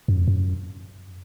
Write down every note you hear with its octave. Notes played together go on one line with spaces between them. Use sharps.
F#2
F2
F#2